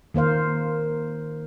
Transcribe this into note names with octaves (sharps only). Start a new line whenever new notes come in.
D#3 A#3 C5 F5